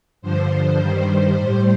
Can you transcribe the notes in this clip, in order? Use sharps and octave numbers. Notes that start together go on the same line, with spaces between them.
G2 D3 F3 C5
G2 D#3 G3
A2 G3 C5